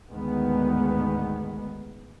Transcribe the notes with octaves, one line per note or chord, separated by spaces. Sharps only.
D2 G#2 D#3 G#3 B3